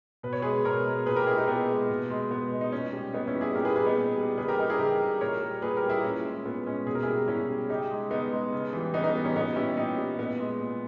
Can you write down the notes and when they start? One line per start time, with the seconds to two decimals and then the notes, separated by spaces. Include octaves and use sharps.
0.23 B2 B4
0.33 C#5
0.42 G#3 G#4 B4
0.65 B2 A#4 C#5
0.85 G#3
1.06 A#2 G#4 B4
1.16 G4 A#4
1.27 G#3 E4 G#4
1.37 D#4 G4
1.48 A#2 B3 D#4
1.69 G#3
1.90 B2
2.10 G#3
2.30 B2 B3
2.52 G#3
2.61 D#4
2.72 A#2 C#4
2.93 G3
3.13 A#2 B3 D#4
3.28 C#4 E4
3.35 G3
3.41 E4 G#4
3.55 A#2 G4 A#4
3.65 G#4 B4
3.76 G3 G#4 B4
3.86 B3 D#4
3.96 A#2
4.18 G3
4.38 C#3 G#4 B4
4.48 G4 A#4
4.59 G3 D#4 G4
4.69 E4 G#4
4.79 C#3 G4 A#4
5.00 G3
5.21 A#2 A#4 C#5
5.42 G3
5.62 A#2 G#4 B4
5.77 G4 A#4
5.84 G3
5.90 E4 G#4
6.04 A#2 C#4
6.24 G#3
6.45 A#2 B3
6.66 G#3 C#4
6.86 B2 G#4
6.95 A#4
7.03 G3 E4 G#4
7.28 B2 C#4 E4
7.49 G3
7.69 C#3 D#4 G4
7.91 G#3
8.11 C#3 B3 D#4
8.32 G#3
8.52 C#3
8.73 E3 G3
8.94 C#3 B3 D#4
9.04 B3 D#4
9.15 G3 B3
9.20 E3
9.25 C#4
9.36 A#2 B3 D#4
9.56 G3 C#4 E4
9.77 A#2 D#4 G4
9.97 G3
10.18 A#2 B3
10.40 G#3
10.60 A#2